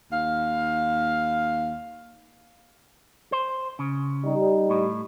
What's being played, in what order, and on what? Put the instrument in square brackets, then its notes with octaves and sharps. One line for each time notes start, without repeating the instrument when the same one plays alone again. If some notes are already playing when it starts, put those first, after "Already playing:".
[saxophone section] D#2 F5
[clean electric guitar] C5
C#3
[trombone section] G3 D#4
[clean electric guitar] A2